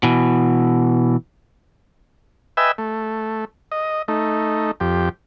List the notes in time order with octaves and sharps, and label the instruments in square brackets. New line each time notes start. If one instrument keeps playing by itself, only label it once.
[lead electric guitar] B2 E3
[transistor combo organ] B4 D#5 E5 G5 G#5 E6
A3
D#5
A3 D#4
F2 G4